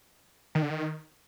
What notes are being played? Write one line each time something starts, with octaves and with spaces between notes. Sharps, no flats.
D#3
D3
D#3